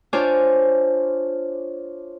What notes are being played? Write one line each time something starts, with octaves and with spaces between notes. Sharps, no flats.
D4 F4 C5 C#5 G#5 D6